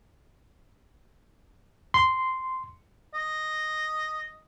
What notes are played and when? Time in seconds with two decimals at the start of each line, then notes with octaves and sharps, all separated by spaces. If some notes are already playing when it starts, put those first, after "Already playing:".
1.94 C6
3.14 D#5